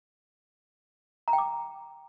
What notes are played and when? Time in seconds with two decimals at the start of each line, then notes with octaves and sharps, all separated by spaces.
1.28 A#5
1.33 G5
1.38 D6